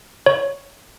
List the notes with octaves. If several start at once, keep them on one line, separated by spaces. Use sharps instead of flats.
C#5